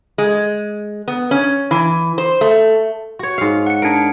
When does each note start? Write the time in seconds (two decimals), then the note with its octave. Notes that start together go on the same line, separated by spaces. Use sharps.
0.18 G#3
1.08 B3
1.31 C#4
1.71 E3
2.18 C5
2.41 A3
3.19 F#4 C#5
3.38 G#2 F5
3.66 F#5 C#7
3.82 D4 A#4 C#7 D7